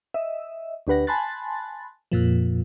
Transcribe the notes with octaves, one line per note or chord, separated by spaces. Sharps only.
D#5 E5
D2 D4 G4 B4 F#5 A#6
G#5 A5 B5 C6 F#6 A6
F2 A#2 F3